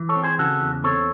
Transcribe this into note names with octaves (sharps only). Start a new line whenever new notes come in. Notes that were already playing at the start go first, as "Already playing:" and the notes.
Already playing: E3
A4 C#5
C4
G#4 C5
C#3 F#4 A4
E2
C4 A4 C#5